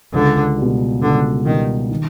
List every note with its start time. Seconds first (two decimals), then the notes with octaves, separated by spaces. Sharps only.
0.13 C#2 D3
0.58 B2 G3
1.01 C#2 D3
1.46 B2 D#3 G3
1.90 D#3